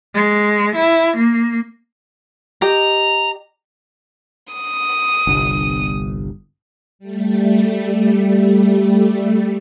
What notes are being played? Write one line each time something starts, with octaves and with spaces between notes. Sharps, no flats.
G#3
E4
A#3
G4 D#5 A#5
D#6
G1 C2
G3 A3